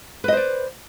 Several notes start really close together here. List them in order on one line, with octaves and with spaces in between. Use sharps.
B4 D#5 C5 D5